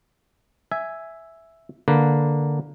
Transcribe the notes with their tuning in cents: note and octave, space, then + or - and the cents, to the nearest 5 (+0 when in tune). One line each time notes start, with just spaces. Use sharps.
E5 +0 G#5 +0
D3 +0 A#3 +0 B4 +0